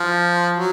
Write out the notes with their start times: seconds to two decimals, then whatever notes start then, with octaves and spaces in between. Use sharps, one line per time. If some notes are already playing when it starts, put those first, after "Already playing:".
Already playing: F3
0.57 F#3